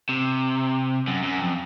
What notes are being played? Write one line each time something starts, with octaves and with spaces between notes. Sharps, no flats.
C3
F#2
F#2
F2